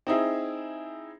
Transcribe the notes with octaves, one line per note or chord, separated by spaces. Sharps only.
C4 D#4 E4 G#4